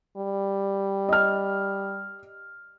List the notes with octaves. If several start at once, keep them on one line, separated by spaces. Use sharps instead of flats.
G3
D#5 F6